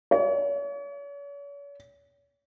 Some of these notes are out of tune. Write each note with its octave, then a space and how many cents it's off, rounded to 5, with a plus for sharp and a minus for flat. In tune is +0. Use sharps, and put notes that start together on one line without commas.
C#5 +40